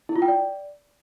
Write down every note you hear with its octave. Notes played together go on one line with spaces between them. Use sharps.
E4
F4
G5
D5